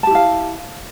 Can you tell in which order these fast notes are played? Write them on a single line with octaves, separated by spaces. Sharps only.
A5 G4 E4 F5